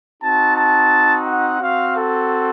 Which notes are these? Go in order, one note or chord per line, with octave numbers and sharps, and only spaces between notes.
C4 D#4 F#4 A5
A5
F#5
C4 F#4 F5
A4